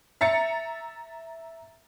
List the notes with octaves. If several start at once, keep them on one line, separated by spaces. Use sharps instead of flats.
E5 A#5 A6 C#7